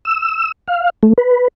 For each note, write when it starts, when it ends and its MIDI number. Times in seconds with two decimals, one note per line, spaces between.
0.05 0.52 88
0.68 0.90 77
1.03 1.13 57
1.18 1.48 71